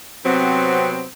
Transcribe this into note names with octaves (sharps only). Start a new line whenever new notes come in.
C3 F#3 B3 C4